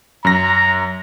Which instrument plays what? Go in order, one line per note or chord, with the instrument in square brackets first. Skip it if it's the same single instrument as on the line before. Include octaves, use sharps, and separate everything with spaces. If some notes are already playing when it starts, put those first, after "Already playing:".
[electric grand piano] F#2 A#6 [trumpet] A#5